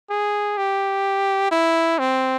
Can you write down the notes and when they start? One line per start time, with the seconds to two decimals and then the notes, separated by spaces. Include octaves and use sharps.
0.10 G#4
0.57 G4
1.52 E4
1.99 C4